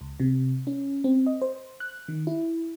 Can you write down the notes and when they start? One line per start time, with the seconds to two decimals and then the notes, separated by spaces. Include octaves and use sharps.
0.01 C#2
0.20 C3
0.67 C#4
1.04 C4
1.27 D#5
1.42 C5
1.80 F#6
2.08 D#3
2.27 E4